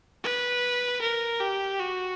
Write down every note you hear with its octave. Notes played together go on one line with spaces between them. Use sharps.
B4
A#4
G4
F#4